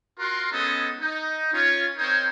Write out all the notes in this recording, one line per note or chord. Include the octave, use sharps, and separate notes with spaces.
F4 F#4 A#4 F#5 C6
G#3 B3 C#4 D#4 A4 D#5
D#4
C#4 F4 C#5
C4 D#4 A#4 C5 C#5